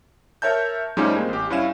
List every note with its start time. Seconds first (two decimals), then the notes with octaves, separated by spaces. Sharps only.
0.42 A#4 C#5 E5 A5 G6
0.97 G#2 F3 G3 A3 C#4 D#4
1.15 G#3 A#3 C4
1.29 A1 G4
1.50 G2 C#4 E4 F5 E7